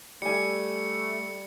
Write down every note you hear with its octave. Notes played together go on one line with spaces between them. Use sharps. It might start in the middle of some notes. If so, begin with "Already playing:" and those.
G3 A3 G#5 C#7